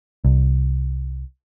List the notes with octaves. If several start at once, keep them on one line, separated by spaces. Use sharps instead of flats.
C2